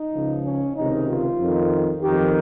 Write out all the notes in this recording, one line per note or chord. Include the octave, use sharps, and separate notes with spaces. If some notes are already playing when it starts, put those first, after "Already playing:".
Already playing: D#4
C#2 C#3 F3
C#4
C#2 C3 D#3 D#4
F4
F2 D#3
F2 D#3 G4